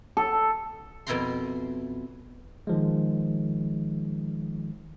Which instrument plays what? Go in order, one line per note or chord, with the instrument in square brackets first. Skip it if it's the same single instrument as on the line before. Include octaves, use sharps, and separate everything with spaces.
[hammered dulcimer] A4
[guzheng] F2 B2 E4 G5 A#5 C6
[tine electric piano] D#3 F3 G#3